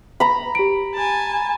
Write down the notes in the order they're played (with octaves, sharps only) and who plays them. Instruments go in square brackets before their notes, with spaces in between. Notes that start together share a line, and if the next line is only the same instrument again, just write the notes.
[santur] A#5 B5
[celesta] G4 D7
[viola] G#5 A5